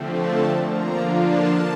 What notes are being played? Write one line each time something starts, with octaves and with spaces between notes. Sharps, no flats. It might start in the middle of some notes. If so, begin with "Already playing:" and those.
Already playing: D3 F3 A3 C4
A5
D3 F3 A#3 D4 F4 A#5
A5